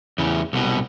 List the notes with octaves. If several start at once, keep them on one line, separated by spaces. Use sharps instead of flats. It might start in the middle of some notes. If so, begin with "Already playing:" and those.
E2 C#3
C2 B2